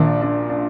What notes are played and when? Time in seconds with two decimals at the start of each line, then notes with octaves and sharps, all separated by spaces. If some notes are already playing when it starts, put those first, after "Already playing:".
Already playing: A#1 A#2 D#3 D4
0.22 D4
0.50 D4